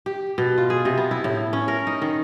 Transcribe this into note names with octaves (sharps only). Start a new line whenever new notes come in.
G4
B2
F4
G#4
C3
B3
E4
A2
C#4
A#4
D#4
D#3